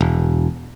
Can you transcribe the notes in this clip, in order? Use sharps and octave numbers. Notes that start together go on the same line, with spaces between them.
E1